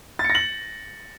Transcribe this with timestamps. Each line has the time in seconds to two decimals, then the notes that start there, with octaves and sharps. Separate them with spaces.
0.19 A6
0.24 C#7
0.30 A#6
0.35 F#7